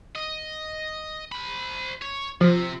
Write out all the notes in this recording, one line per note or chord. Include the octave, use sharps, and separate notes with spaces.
D#5
C5 B5
C#5
C3 F3 C4